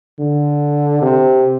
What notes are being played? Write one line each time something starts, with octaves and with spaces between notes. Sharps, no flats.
D3
C3